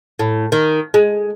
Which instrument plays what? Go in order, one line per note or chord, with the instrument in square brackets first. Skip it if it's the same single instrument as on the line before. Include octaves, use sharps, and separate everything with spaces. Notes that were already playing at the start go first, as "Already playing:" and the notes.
[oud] A2
D#3
G#3